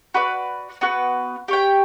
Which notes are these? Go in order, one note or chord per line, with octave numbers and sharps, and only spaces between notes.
F#4 B4 D5
B3 F#4 B4
G4 C#5 G5